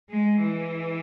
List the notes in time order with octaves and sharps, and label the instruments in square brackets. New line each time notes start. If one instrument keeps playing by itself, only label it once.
[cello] G#3
E3